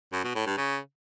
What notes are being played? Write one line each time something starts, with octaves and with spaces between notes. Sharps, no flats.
F#2
B2
A2
G2
C#3